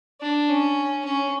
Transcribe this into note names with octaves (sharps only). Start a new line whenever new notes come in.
D4
C#4
C#4